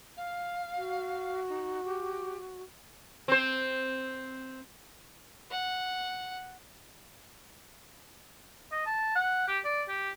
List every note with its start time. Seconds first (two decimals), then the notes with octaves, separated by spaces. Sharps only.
0.17 F5
0.76 F#4
1.49 D#4
1.84 G4
3.28 C4 C5
5.51 F#5
8.72 D#5
8.86 A5
9.15 F#5
9.48 G4
9.65 D5
9.88 G4